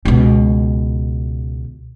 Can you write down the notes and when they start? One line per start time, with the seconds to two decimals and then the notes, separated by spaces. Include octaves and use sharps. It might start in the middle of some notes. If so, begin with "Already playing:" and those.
0.05 C#2 B2